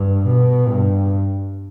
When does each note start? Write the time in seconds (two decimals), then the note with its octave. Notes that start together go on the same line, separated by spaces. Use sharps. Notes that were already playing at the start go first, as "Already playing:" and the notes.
Already playing: G2
0.25 B2
0.68 G2